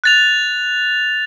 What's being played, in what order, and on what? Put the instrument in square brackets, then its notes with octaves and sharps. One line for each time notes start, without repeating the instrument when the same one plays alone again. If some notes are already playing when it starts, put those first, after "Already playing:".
[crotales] F#6 A6 F7